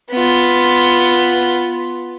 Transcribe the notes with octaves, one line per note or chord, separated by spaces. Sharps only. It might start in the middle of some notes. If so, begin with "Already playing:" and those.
B3 F4